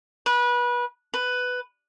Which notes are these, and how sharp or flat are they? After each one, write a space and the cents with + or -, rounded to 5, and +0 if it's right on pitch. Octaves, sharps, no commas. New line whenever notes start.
B4 -25
B4 +10